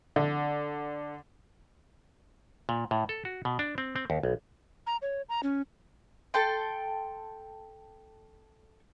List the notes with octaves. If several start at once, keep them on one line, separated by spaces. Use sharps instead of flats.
D3
A#2
A2
A4
F#4
B2
D4
C4
C4
D#2
B1
A#5
C#5
A#5
C#4
A4 G5 C6